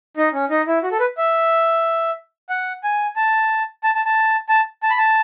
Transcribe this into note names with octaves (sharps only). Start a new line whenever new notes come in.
D#4
C#4
D#4
E4
F#4
A4
B4
E5
F#5
G#5
A5
A5
A5
A5
A5
A5
B5
A5